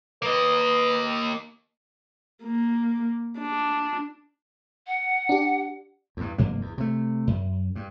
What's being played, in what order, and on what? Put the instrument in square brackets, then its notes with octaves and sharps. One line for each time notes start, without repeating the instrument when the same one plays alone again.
[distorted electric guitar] A#3 D#5 [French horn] B4
[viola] A#3
D4
[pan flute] F#5
[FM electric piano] D4 G4
[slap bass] E2 G2
F1 G2 A#3
E2
C3 A3
F#2
G2